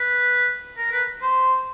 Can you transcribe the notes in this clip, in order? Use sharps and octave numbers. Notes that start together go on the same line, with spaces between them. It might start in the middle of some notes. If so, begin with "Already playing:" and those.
Already playing: B4
A#4
B4
C5